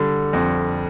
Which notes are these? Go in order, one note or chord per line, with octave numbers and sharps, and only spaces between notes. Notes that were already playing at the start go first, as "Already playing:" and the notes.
Already playing: D3 G3
F2